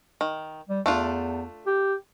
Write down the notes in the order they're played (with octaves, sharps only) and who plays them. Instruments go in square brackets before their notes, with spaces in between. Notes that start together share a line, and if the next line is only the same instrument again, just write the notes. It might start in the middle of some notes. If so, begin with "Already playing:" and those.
[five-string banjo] D#3
[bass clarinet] G3
[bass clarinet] E2 [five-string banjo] A3 D4 F4
[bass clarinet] G4